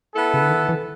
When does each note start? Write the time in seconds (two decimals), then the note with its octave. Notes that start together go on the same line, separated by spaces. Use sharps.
0.14 B3 E4 A4
0.34 C#3
0.42 D3
0.50 D#3
0.69 E3